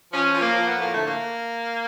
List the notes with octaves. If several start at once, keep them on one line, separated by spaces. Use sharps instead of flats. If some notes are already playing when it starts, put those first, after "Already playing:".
F3 C#4
F3
A#3
F3
B3
A2
A#3
D3 A3
A#3